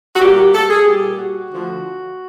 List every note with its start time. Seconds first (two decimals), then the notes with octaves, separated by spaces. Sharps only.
0.15 F#4
0.20 A#2 G3 A#3 G4
0.36 G4
0.53 A4
0.69 G#4
0.85 A#2 G3 A#3 G4
1.18 F#4
1.50 D3 F3 A3